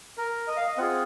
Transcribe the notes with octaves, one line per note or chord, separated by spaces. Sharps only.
A#4
D#5
F5
D#5
C4 F4 G#4 F#5